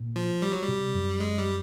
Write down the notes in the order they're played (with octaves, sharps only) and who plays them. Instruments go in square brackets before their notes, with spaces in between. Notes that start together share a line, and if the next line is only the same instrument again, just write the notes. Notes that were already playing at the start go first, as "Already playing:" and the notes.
Already playing: [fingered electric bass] A#2
[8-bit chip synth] F3
G3
F#3
G3
[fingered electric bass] C3
F#2
[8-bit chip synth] G#3
G3